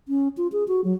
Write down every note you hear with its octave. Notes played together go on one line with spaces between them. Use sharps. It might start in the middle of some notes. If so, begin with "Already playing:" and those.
C#4
F4
G#4
F#4
F#3